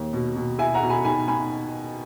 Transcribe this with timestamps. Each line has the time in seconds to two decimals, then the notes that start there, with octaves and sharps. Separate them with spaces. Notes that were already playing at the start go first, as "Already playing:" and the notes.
Already playing: D#2
0.13 B2
0.35 B2
0.58 E4 E5 G#5
0.74 F#5 A#5
0.82 B2
0.90 G#5 B5
1.05 D#3 G#5 B5
1.28 D#3 G#5 B5